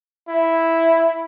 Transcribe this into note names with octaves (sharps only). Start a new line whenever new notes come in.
E4